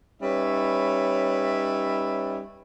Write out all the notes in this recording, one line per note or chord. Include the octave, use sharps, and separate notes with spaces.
G3 C#4 D#4 B4 C#5 E5